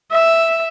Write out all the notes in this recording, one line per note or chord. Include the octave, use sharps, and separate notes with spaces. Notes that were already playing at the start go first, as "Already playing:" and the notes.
E5